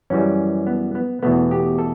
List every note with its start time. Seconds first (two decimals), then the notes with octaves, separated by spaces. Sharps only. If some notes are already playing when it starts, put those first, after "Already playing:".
0.10 F#2 E3 G3 C#4
0.67 B3
0.95 B3
1.23 E2 B2 A3 B3
1.51 G4
1.79 A4